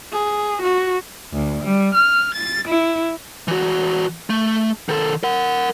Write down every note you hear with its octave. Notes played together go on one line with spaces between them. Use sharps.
G#4
F#4
D2
G3
F6
A6
E4
E3 F#4
A3
D#3 A4
A#4 F#5